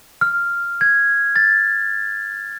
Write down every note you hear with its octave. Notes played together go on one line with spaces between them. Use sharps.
F6
G#6
A6